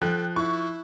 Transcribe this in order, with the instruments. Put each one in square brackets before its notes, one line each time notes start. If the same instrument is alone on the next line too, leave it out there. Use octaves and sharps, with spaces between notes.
[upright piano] F3 [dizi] A4 [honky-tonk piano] G5 F#6
[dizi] E4 [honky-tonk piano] C#6